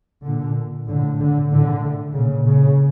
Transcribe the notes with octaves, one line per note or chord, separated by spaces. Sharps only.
A#2 D3
A2 D3
D3
A2 D3
A#2 C#3
C#3